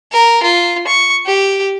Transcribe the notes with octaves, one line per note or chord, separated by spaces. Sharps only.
A#4
F4
C#6
G4